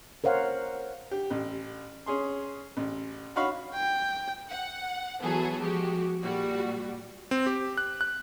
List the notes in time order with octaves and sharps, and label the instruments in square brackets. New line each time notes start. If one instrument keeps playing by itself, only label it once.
[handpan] A#4 C5 C#5 F5 F#5
[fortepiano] G4
A1
C#4 G#4 C6
A1
D#4 F#4 C#5 F5 B5 C#6
[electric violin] G5
[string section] F#5
E3 F#3 B3 E4 G#4 A4
F3 G#3 F#4 G4
A#2 G3 F#4
[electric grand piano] C4
G4
F#6
F#6